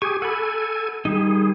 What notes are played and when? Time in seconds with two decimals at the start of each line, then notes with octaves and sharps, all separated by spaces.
0.02 G4 G#4 G#5 C#6
0.22 A4 F#5 G#5 B5
1.05 D#3 G3 D#4 G#4